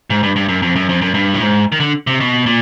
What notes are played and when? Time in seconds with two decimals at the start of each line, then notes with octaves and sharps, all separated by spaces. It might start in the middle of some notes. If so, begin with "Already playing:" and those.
0.10 G#2
0.23 G2
0.36 G2
0.49 F#2
0.62 F2
0.76 F#2
0.89 F2
1.01 F#2
1.14 G2
1.34 A2
1.41 G#2
1.72 D#3
1.80 D3
2.07 C3
2.20 B2
2.46 A#2